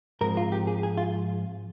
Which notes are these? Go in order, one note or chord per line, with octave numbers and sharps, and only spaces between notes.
G#2 F3 G#3 C4 A#4
F4
G4
G#4
G#4
F4